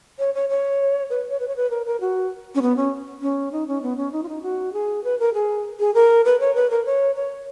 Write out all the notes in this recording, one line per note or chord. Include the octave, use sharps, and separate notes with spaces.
C#5
C#5
C#5
B4
C#5
B4
C#5
B4
A#4
A#4
F#4
C#4
B3
C#4
C#4
D#4
C#4
B3
C#4
D#4
F4
D#4
F#4
G#4
B4
A#4
G#4
G#4
A#4
B4
C#5
B4
A#4
C#5
C#5